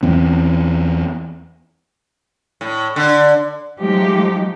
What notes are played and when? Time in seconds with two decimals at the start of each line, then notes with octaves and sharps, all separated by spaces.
0.03 E2 E3 C4
2.61 A2
2.96 D3
3.79 F3 F#3 G#3 A3 D#4 G4